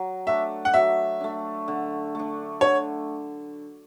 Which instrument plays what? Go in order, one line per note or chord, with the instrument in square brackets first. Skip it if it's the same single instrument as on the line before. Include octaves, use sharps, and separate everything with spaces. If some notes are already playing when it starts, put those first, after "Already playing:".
Already playing: [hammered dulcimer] F#3
[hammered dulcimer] A3 D4 [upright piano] E5
[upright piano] F#5
[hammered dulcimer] F#3 [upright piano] E5
[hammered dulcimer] A3 D4
D3
A3 D4
[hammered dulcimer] D3 [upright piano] C#5